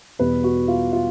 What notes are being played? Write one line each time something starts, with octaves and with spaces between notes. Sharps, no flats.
E2 B2 G3 B3 B4
F#4
F4
F4